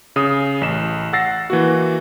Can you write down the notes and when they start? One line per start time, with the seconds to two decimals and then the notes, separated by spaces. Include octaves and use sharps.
0.16 C#3 D#6
0.61 A1 E7
1.13 F#5 E6 A6 A#6 C7
1.50 E3 A#3 F#4